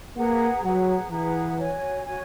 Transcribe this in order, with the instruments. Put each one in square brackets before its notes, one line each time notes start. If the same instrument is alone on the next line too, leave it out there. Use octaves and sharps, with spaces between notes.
[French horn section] A#3 [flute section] G#4 B4 F#5 A#5
[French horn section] F#3 [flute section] G#4 B4 F#5 A#5
[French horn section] E3 [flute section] G#4 B4 F#5 A#5
[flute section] F#4 C#5 G#5
F#4 C#5 G#5